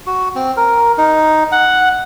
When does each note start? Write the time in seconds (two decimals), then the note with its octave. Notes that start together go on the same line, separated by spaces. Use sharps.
0.06 F#4
0.36 C4
0.57 A#4
0.98 D#4
1.52 F#5